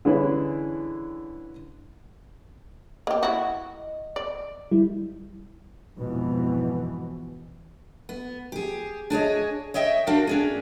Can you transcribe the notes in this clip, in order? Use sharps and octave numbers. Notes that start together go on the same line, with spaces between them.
D3 E3 G3 C#4 E4 G#4
A#3 G4 D#5
E4 F#4
D5
G3 E4
F2 G#2 B2 E3
B3
G4 G#4
D4 G#4 C#5 D#5
C#5 D#5 E5 G5
D4 F#4 A#4 F5 G5
C#4 D4 G#4